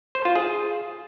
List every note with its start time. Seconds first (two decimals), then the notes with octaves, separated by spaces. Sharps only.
0.15 C5
0.25 F4
0.35 G#4